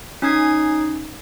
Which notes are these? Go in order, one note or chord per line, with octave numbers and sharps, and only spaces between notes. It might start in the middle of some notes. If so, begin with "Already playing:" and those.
C#4 D#4 G#5 D#6 G#6 C7